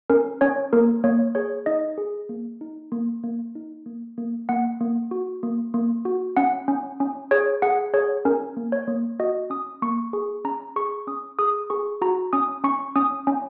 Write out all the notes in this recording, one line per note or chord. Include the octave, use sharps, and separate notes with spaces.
C#4 A#4
C#4 C#5
A#3 A#4
A#3 C#5
G#4 C#5
D#4 D#5
G#4
A#3
D#4
A#3
A#3
D#4
A#3
A#3
A#3 F#5
A#3
F#4
A#3
A#3
F#4
C#4 F#5
C#4
C#4
G#4 C#5
G#4 F#5
G#4 C#5
C#4 A#4
A#3
C#5
A#3
F#4 D#5
C#4 D#6
A#3 C#6
G#4 C#6
C#4 A#5
G#4 C#6
C#4 D#6
G#4 D#6
G#4 C#6
F#4 A#5
C#4 D#6
C#4 C#6
C#4 D#6
C#4